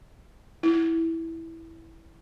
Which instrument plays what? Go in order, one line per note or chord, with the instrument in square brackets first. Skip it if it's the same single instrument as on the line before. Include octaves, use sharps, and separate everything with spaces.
[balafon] E4